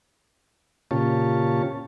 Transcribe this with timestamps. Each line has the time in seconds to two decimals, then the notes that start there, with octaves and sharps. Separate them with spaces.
0.91 A#2 C#3 F4 G4 C#5 A5